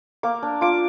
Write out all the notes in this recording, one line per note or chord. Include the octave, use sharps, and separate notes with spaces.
A#3 D6
D4
F4 D6